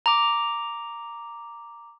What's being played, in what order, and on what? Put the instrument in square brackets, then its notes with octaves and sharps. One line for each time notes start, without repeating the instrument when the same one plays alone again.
[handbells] A#5 D6